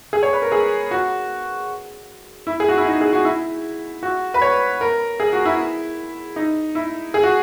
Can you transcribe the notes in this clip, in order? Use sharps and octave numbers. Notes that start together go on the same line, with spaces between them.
G#4
C#5
B4
A#4
G#4
F#4
E4
G#4
F#4
E4
D#4
G#4
F#4
E4
F#4
B4
C#5
A#4
G#4
F#4
E4
D#4
E4
G#4
F#4